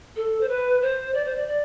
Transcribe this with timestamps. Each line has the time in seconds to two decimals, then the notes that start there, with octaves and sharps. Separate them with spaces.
0.16 A4
0.41 C5
0.49 B4
0.82 C5
1.14 D5
1.25 C5
1.36 D5
1.47 D5